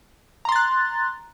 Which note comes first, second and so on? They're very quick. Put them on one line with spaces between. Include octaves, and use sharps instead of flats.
A#5 C6 A6 F#6